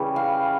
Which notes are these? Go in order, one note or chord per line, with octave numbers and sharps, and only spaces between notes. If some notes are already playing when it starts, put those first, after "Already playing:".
Already playing: C#3 E3 G3 C#5
F5